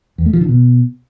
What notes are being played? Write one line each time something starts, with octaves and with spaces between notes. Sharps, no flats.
E2
A3
F3
D3
B2